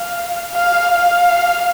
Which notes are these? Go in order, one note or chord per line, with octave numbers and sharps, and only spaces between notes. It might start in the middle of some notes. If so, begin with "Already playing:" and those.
Already playing: F5
F5
F5